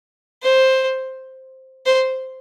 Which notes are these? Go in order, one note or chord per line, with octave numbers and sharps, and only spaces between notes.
C5
C5